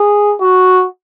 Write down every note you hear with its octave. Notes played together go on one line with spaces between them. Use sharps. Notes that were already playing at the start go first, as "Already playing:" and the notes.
Already playing: G#4
F#4